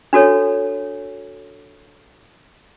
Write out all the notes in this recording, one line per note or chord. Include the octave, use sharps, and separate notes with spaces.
D4 F#4 A4 C#5